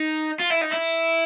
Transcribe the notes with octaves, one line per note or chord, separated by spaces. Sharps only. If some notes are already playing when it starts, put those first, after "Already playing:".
Already playing: D#4
F4
E4
D#4
E4